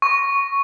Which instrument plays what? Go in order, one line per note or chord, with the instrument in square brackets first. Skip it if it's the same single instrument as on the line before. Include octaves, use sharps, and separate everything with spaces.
[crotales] C#6